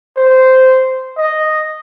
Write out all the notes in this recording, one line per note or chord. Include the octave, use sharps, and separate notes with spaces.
C5
D#5